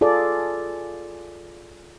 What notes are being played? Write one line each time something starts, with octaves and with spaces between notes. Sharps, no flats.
F4 G#4 A4 D5